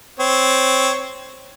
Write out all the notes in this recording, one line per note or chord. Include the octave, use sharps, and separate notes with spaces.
C4 C#5